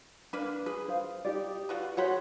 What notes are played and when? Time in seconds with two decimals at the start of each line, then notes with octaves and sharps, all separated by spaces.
0.33 A#3 D4 B4 B5
0.66 G#4 B4
0.88 C5 F5
1.25 D#4 G4 D5
1.69 F4 F#4 B4
1.97 F#4 G#4 C5 C#5 F#5 B5